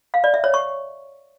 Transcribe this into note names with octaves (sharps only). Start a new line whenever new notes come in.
F5
D5
E5
C#5
C#6